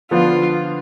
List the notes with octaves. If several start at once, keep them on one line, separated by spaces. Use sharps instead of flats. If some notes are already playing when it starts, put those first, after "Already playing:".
D3 F3 B3 D4 F4